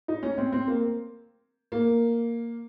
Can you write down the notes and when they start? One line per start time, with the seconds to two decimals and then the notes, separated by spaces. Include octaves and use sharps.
0.08 D#4
0.23 C#4
0.38 C4
0.52 C4
0.67 A#3
1.72 A#3